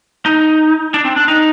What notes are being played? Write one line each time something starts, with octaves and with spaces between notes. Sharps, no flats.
D#4
D4
C4
D4
D#4